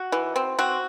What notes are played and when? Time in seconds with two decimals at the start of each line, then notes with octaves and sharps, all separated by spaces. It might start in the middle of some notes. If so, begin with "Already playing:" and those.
Already playing: F#4
0.12 E3
0.36 C4
0.59 C4 F#4